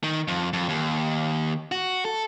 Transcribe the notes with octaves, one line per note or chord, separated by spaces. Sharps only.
D#3
F2
F2
D#2
F#4
A4